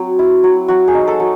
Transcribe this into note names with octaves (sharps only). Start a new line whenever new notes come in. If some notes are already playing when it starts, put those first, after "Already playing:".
Already playing: F#3 C4
E4
F#3
F#3 F#4
G#4
D#4
A4
F#3